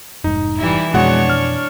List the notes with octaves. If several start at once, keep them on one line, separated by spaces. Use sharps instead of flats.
F1 G#2 D#4
E3 G3 E4
F2 B2 G#3 D4 F#4 C#5 F#5
F6